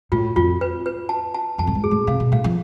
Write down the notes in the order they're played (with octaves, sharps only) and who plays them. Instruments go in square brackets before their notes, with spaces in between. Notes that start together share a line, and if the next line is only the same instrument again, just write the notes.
[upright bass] A2 [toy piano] F4
[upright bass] F2 [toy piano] F4
[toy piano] B4
B4
A5
A5
[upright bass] F2 [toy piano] A5
[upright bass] A2
G#2
[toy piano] G#4
[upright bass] A2
[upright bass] C3 [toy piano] F5
[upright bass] B2
[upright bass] A2 [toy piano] F5
[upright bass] F3